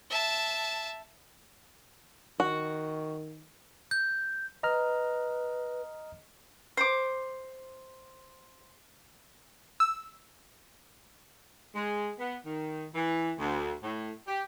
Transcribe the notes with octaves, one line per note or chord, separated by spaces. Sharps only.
E5 A5
D#3 F#4
G6
B4 D#5 A#5 F6
C5 D6
E6
G#3
B3
D#3
E3
D2
A2
G4